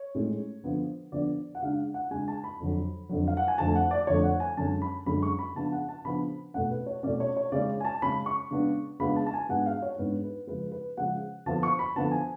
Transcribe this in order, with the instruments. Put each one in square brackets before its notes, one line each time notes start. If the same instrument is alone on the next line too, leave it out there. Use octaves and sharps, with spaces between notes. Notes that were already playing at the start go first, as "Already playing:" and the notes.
Already playing: [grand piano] C#5
A2 G#3 C#4
D3 F3 B3 D4
D3 F3 B3 D4 D5
F#5
C#3 G#3 D4 F5
F#5
C#3 G#3 D4 G#5
A5
B5
F2 D3 F#3
F2 D3 F#3
F5
F#5
G#5
F2 D3 F3 A3 A5
F#5
D5
F2 D3 F3 A3 C#5
F#5
G#5
F#2 D3 G#3 C#4 A5
B5
F#2 D3 G#3 C#4 B5
C#6
B5
C#3 F3 B3 D4 A5
F#5
A5
C#3 F3 B3 D4 B5
B2 A3 C#4 F#5
B4
C#5
B2 A3 C#4 D5
C#5
C#5
C#3 G#3 C#4 D5
G#5
A5
C#3 G#3 C#4 B5
C#6
C#3 G#3 B3 D4
C#3 G#3 B3 D4 B5
A5
A5
G#5
G#2 G#3 B3 D4 F#5
F5
C#5
G#2 G#3 B3 D4 B4
B4
C#3 F3 G#3 B4
B4
C#3 F3 G#3 F#5
D3 F3 B3 D4 A5
C#6
B5
D3 F3 B3 D4 A5
G#5